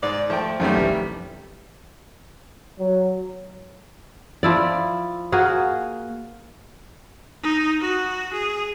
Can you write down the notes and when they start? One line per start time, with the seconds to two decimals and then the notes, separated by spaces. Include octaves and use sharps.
0.03 G#2 D5
0.30 F3 A3 G5
0.60 F#2 D#3 G3 A3 C4 C#4
0.76 F1 E3
2.79 F#3
4.43 F3 E4 D5
5.32 A#3 F#4 G#4
7.43 D#4
7.81 F#4
8.34 G#4